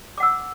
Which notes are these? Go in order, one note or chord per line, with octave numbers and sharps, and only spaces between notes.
F#5 D6 E6